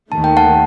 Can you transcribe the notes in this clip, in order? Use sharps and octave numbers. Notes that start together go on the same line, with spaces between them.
D#2 D#3 A3 A5
G5
F#5 A5